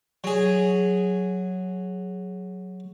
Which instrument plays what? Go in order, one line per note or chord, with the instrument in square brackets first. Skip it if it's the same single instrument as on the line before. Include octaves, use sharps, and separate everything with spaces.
[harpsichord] F#3 G#4